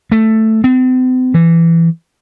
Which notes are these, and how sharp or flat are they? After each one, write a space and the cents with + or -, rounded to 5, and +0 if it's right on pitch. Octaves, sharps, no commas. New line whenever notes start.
A3 +5
C4 -45
E3 +15